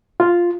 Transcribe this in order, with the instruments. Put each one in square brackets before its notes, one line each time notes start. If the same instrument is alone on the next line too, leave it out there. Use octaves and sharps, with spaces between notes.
[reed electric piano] F4